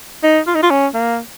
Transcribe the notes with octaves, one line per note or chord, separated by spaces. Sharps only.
D#4
F4
D#4
F4
C#4
A#3